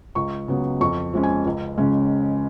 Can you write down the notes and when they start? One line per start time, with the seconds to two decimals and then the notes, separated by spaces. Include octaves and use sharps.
0.15 C#2 C#6
0.48 C#3 F#3 B3
0.81 F2 C#6
1.13 F3 G#3 C#4
1.23 G#5
1.46 C#2
1.77 C#3 G#3 C#4